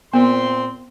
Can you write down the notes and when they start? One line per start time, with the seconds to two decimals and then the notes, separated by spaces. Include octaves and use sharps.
0.14 A#2 B3 C4 C6